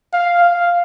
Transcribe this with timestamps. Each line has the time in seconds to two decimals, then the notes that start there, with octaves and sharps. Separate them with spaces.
0.13 F5
0.42 F5